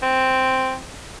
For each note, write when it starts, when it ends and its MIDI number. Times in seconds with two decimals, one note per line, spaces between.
0.02 0.77 60